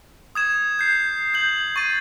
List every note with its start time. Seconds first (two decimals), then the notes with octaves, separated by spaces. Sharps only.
0.35 D#6 G#6 E7
0.79 G6 C7
1.34 G6 F#7
1.76 C#6 A6 D#7